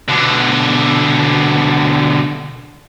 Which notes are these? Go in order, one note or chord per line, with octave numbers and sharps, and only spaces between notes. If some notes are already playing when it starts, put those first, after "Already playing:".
B2 D3